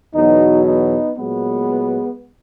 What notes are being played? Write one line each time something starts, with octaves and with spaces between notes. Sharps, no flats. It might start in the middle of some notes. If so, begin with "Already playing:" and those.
E2 B2 F#3 B3 D#4
B3 D#4
A#2 F#3 G#3 B3